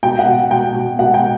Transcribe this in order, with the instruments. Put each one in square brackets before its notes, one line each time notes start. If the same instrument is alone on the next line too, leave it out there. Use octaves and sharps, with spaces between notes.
[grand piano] B2 G5
F#5
B2
B2 G5
B2
B2 F#5
G5